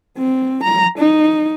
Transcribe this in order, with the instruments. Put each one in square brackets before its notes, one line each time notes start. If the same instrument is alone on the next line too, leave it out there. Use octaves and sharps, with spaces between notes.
[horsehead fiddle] C4
A#5
D#4